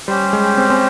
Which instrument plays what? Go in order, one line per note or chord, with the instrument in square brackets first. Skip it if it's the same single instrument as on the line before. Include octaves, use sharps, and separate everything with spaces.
[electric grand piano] G3 [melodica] C#4 G4 C5
[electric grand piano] G#3
C4
C4